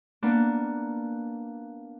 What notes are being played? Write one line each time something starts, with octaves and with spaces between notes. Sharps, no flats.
A#3 B3 D4